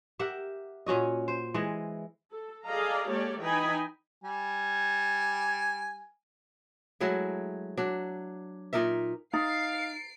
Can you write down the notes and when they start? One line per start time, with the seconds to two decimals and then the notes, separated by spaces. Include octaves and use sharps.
0.19 G4 A#4 E5 F#5
0.86 A#2 C#4 F#4 D#5
1.28 C5
1.54 E3 G#3 D#5
2.32 A4
2.66 G#4 A4 D5 D#5 F5 A#5
3.09 G#3 A#3 G4 A4 C#5 D5
3.40 E3 D#4 D#5 G5 G#5 B5
4.24 G3 G#5
7.00 F#3 G#3 A3 E4
7.77 F#3 D4
8.73 A#2 D#4 A#4 E5
9.33 D#4 F5 A#5 A6 C7 D7